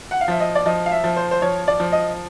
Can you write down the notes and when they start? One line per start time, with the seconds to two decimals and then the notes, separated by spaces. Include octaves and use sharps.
0.11 F#5
0.21 F5
0.28 F3 E5
0.40 D#5
0.55 D5
0.66 F3 D#5
0.86 F5
0.91 E5
1.04 F3
1.16 C5
1.31 C5
1.42 F3 C#5
1.68 D5
1.80 F3
1.92 D#5